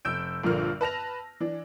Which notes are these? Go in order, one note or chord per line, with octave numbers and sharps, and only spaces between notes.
F1 E6 G6 D7
A#1 G2 A#2 D3 A#4 F6
B4 A5 A#6 F7
E3 D4